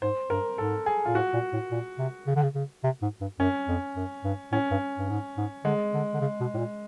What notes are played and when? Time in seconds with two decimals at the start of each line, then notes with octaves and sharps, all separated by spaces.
0.02 G#2 C5
0.30 G2 A#4
0.58 G#2 A4
0.86 G#4
1.05 A#2 F4
1.15 A2 F#4
1.33 A#2
1.53 A2
1.71 A#2
1.98 C3
2.27 C#3
2.36 D3
2.43 C#3
2.55 C#3
2.84 C3
3.02 G#2
3.21 G2
3.39 F#2 C#4
3.68 F2
3.96 F#2
4.24 G2
4.52 A2 C#4
4.71 G2
4.98 G2
5.09 G#2
5.37 G#2
5.64 D3 G#3
5.94 D3
6.14 D3
6.21 C#3
6.40 B2
6.54 A2
6.58 A#2